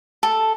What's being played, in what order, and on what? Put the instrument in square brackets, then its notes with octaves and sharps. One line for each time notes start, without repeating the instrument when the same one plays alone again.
[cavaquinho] A4